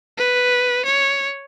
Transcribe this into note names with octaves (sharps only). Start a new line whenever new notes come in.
B4
C#5